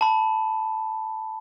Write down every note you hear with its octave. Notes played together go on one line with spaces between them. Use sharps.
A5 B5